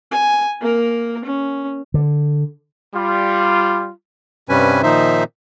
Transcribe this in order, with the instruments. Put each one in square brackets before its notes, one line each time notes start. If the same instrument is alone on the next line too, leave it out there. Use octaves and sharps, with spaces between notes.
[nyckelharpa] G#5
A#3 A#4
C#4
[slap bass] D3
[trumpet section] G3 F4
[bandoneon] G2 C3 G3 C#4 B4 G#5
A#2 D#3 F3 D#4 C5 E5